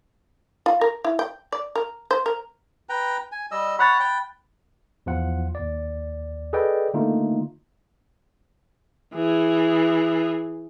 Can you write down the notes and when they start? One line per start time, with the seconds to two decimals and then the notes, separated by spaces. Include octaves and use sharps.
0.66 F4
0.81 A#4
1.04 E4
1.19 G5
1.52 D5
1.75 A#4
2.11 C5
2.26 A#4
2.89 B4 G5 A#5
3.32 G#5
3.51 G3 D#5 E6
3.79 C#5 F#5 B5 F#6 A6
4.00 G5
5.06 E2 F3 F4 F#5
5.55 D#2 D5
6.53 G#4 A4 B4 D5 D#5 G5
6.94 D3 A3 A#3 D#4 F4
9.14 E3 G#4